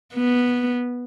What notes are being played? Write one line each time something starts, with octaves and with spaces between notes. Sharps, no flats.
B3